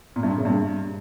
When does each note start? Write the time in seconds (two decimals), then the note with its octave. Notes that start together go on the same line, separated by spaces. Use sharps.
0.16 A#2
0.23 G2
0.31 A#2
0.38 C#3
0.45 G2